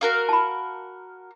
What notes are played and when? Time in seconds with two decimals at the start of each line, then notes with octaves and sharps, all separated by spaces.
0.01 F#4 A#4 F5
0.29 A5 B5